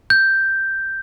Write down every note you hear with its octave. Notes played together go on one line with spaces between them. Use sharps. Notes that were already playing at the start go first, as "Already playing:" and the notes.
G6